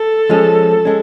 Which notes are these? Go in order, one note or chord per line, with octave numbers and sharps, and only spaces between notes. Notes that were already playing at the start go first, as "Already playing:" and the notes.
Already playing: A4
F3 G#3 C#4
G#3 C#4